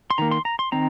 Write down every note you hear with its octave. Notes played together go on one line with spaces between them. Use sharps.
C6
D#3 A#3 A#5
C6
A#5
C6
D#3 C4 A#5